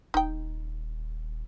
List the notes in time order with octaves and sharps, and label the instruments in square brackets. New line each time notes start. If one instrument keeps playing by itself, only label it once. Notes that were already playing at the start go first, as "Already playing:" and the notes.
[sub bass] D#1 [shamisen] D#4 G5